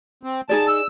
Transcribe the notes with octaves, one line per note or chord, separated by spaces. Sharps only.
C4
D#4 G#4 D5 A5
E6